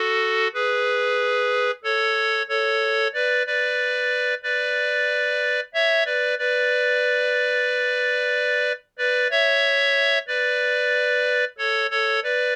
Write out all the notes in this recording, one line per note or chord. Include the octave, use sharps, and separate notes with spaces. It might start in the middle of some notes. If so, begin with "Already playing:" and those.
Already playing: F#4 A4
G#4 B4
A4 C#5
A4 C#5
B4 D5
B4 D5
B4 D5
C#5 E5
B4 D5
B4 D5
B4 D5
C#5 E5
B4 D5
A4 C#5
A4 C#5
B4 D5